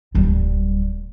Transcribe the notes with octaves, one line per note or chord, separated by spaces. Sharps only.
D1 G3